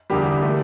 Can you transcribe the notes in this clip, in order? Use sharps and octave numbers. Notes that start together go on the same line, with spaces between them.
E2 D3 G3 A#3 G4
D3 A3